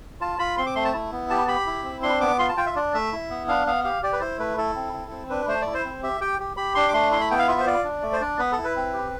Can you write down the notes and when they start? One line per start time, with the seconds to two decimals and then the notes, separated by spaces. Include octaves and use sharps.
0.21 F4 A5
0.39 F4 B5
0.58 C4 C6
0.66 D6
0.76 A3 C6
0.85 A5
0.94 E4
1.12 B3
1.30 G4 A5
1.48 G4 B5
1.66 E4
1.84 C4
2.03 D4 C6
2.21 B3 D6
2.39 F4 C6
2.49 A5
2.57 F4 G5
2.66 E5
2.76 D4 D5
2.94 A3 E5
3.12 E4
3.30 B3
3.48 D4 F5
3.66 B3 F5
3.84 G4 F5
4.03 G4 D5
4.13 B4
4.21 E4 C5
4.39 A3 B4
4.58 E4 A4
4.76 C4
4.93 E4
5.11 C4
5.30 D4 B4
5.48 A3 C5
5.61 D5
5.67 E4
5.74 C5
5.85 C4
6.03 G4 E5
6.21 G4 G5
6.39 G4
6.57 G4 B5
6.75 D4 C6
6.88 D6
6.93 A3 C6
7.11 E4 C6
7.21 B5
7.31 B3 G5
7.39 F5
7.48 F4 E5
7.60 C5
7.66 F4 D5
7.84 D4
8.03 A3
8.13 C5
8.21 D4 D5
8.39 B3 B4
8.52 A4
8.58 E4
8.64 B4
8.76 C4
8.93 G4